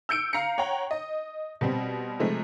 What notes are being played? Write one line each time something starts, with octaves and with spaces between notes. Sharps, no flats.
E6 G6 C#7 D7
F5 A#5 C7 C#7
C#5 F#5 G5 A#5
D#5
B2 G3 C4
C3 F3 G#3 A3